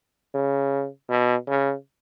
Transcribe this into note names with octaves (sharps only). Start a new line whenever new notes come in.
C#3
B2
C#3